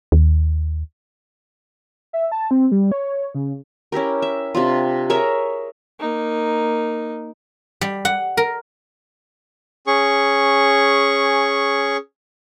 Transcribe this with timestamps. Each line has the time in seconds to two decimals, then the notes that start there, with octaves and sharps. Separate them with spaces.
0.12 D#2
2.13 E5
2.32 A5
2.51 C4
2.72 G3
2.92 C#5
3.35 C#3
3.92 C#4 E4 G4 A#4
4.22 E5
4.55 C3 D4 F4
5.10 G#4 A#4 C#5 E5
6.00 A#3 D#4
7.81 G3
8.05 F#5
8.37 A#4
9.87 C#4 G#4 C#6